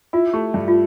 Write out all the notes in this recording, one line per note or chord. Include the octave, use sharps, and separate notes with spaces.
E4 F4
A3 G4
G2
F4